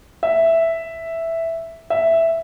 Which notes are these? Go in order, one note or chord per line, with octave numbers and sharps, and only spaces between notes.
E5
E5